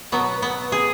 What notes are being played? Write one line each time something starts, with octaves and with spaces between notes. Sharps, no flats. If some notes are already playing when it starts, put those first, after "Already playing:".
B2 F#3 B3
B3
G#4